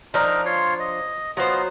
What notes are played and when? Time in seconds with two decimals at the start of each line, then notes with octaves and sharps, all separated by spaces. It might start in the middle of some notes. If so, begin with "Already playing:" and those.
0.14 F3 D4 D#4 A#4 D#5 A#5
0.46 F4 C#5 C6
0.80 D#5
1.37 F#3 B3 F4 C5 D#5